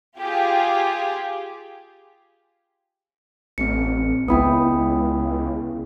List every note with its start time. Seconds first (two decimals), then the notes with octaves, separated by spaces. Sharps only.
0.19 F4 G4 G#4
3.58 A1 C4 C#7
4.28 C#2 B3 E4 G5 B5 D#6